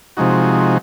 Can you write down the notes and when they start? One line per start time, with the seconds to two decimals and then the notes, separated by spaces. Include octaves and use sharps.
0.17 C3 F3 G#3 D#4 F#4